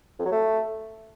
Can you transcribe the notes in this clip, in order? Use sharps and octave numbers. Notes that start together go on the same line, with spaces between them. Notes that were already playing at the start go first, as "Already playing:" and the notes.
F2
F#3
A3